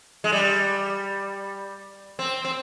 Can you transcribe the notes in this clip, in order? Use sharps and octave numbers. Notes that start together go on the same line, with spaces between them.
G#3
G3
C4
C4